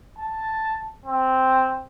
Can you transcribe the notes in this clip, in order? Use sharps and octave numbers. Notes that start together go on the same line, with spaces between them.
A5
C4